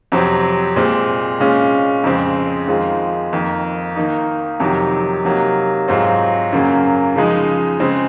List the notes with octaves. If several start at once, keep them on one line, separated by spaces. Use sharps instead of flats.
F2 C3 F#3 C4
A#2 G#3 C4
A#2 G#3 C#4 F4
F2 C#3 G#3 C4
F2 D#3 G#3 C4 F4
F2 D#3 A#3
D#3 A#3 D#4
F2 C3 D#3 F#3
C3 F#3 A#3 D#4
G#2 F#3 C4 F4
F#2 C#3 F#3 A#3
C#3 F3 G#3 D#4
C#3 G#3 C4